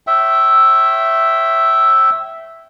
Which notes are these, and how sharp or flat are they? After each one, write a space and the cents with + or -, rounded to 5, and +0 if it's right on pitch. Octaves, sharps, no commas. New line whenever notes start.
C#5 -40 E5 +0 G5 -25